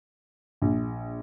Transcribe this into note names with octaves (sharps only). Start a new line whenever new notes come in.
A#1